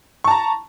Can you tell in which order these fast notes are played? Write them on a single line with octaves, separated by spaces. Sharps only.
C#6 A5 A#5